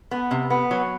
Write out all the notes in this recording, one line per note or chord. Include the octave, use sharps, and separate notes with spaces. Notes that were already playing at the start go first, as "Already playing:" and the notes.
B3
C3
B3
F#3